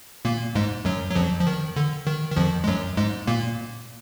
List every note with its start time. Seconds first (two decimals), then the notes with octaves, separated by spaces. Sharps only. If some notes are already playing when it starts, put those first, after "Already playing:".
0.25 A#2 A#3
0.55 G#2 G#3
0.85 F#2 F#3
1.11 F#3
1.15 F2 F3
1.40 F3
1.47 D#3
1.76 D3
2.07 D#3
2.31 D#3
2.36 F2 F3
2.64 G#3
2.68 F#2 F#3
2.97 G#2 G#3
3.27 A#2 A#3